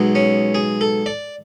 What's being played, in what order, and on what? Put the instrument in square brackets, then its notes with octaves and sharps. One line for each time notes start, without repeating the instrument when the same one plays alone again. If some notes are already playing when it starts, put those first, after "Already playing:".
Already playing: [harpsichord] B1 B2 G#3
C#4
G#4
A4
D5